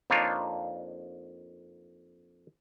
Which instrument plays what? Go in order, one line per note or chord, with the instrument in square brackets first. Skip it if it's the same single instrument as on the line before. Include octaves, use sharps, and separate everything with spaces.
[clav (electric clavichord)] F2 A#3 D4 D#4 F4 C#5